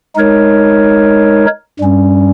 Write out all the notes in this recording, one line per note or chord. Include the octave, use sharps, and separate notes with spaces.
G#3 D#4 A#4 C#5
G2 G3 C#4